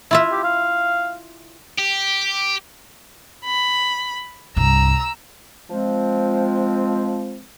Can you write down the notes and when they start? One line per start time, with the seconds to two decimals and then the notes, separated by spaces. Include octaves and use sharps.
0.11 E4 F4 E5
0.31 G4
0.44 F5
1.79 G4
3.45 B5
4.56 C2 G2 A#5 E6
5.69 F3 G#3 C4